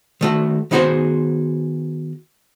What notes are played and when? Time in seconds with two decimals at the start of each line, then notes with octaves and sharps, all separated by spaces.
0.21 D#3 A3 F#4
0.71 D#3 B3 D#4 F#4 G#4 C5